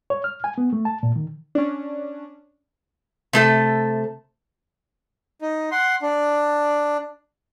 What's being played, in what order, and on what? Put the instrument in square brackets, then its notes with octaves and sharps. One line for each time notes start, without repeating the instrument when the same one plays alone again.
[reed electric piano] C#5
F6
G#5
B3
A3
A5
A#2
D#3
[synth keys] C#4 D4
[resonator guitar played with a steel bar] C3 A3 A4
[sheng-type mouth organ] D#4
F#5 C6
D4